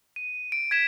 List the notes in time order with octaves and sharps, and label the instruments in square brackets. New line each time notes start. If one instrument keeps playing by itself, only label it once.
[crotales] D#7
D7
G#6 B6 E7